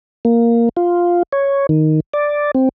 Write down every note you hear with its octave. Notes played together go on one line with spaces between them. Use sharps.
A#3
F4
C#5
D#3
D5
C4